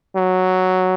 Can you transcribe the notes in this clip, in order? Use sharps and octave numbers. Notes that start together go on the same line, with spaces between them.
F#3